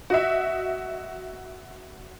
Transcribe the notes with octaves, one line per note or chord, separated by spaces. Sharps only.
F#4 D#5 E5